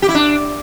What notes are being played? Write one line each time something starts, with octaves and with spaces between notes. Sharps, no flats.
G4
E4
D4